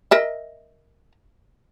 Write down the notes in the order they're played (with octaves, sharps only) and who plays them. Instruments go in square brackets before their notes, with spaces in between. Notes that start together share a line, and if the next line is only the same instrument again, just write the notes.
[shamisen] A#4 D#5 E5